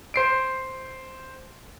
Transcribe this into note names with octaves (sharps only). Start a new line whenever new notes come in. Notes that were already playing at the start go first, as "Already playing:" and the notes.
C5 C7 D7